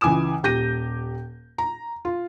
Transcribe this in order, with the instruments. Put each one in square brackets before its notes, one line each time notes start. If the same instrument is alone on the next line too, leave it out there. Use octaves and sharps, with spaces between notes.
[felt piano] C#2 E3 G#5 D6 D#6 E7
D#1 G4 G6 A#6 D#7
A#5
F4